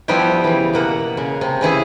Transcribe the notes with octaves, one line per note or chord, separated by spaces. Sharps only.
F3 G3 B3 E4 G4
C#3 E3
B2 A#3 F#5
C#3
C3
C#3 E3 E4 G#4